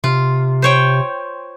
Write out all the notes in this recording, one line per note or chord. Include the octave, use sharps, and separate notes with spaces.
C3 F4
C5 C#5 G5